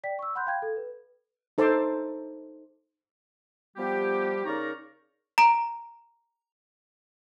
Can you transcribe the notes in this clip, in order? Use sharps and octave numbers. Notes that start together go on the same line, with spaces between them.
D5 G5 B6
C#6 E6
F#5 B5 C6 F#6 G6
F5 G5 B5 G#6
A4
B4
D#4 A4 C5 A5 C6 D6
F3 G3 B3 G4
C#3 D#4 A#4 D5 A#5 C#6
A#5 D7